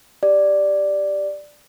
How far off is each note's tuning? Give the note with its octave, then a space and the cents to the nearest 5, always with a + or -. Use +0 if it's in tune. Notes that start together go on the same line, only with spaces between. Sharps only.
G4 +0 D5 +0